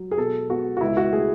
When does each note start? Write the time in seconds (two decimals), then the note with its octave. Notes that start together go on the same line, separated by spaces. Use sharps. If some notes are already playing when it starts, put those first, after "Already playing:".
Already playing: F#3
0.11 G#4
0.17 B2 A4
0.49 B3 F#4
0.77 F#4
0.81 C#2 E4
0.97 F#4
1.13 A3 G#4